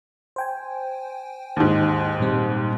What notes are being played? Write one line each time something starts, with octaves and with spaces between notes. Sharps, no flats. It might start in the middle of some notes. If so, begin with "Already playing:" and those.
C5 G5 G#5
D#2 G#2
A#2 G3 C4